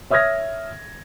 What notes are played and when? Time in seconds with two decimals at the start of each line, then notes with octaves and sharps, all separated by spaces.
0.10 C#5 E5 D#6 F6 G#6 A#6